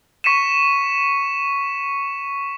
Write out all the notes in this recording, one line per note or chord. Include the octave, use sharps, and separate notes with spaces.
C#6 B6 C#7 D#7 E7